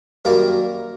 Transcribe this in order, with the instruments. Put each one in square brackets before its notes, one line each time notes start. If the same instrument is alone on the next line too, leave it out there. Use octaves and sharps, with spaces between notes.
[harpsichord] F#2 D#3 G3 A#3 A#4